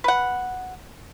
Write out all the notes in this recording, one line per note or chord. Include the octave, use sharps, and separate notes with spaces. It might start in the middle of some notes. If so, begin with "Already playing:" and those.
B4 F#5